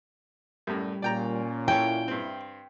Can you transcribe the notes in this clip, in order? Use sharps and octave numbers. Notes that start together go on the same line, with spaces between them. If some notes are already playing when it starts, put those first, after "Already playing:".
F#2 A2 G3
A#2 C#4 D5 G5 A#5
E4 A4 C#5 G5 G#5
G2 C4